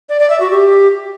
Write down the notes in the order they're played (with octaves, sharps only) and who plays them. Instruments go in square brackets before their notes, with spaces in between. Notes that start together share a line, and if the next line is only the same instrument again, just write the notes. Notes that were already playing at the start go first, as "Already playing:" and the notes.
[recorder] D5
D5
E5
F#4
G4